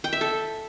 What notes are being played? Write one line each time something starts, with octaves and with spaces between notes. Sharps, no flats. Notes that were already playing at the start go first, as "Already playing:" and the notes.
G5
E5
A4